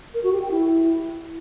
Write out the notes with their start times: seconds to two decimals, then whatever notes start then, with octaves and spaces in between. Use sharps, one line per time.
0.14 A#4
0.24 F#4
0.33 G4
0.42 G5
0.51 E4